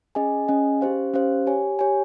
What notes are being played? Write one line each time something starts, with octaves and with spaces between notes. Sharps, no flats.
C#4 G#4 D#5 G#5
C#4 G#4 D#5 G#5
C#4 G4 C5 F5
C#4 G4 C5 F5
G4 C#5 G#5
G4 C#5 G#5